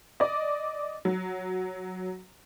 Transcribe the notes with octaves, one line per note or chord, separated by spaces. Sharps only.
D5 D#5
F#3